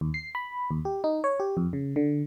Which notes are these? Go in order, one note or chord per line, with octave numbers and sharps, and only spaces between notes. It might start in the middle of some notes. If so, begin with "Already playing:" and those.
D#2
C7
B5
D#2
G4
D#4
C#5
G4
F2
C#3
D3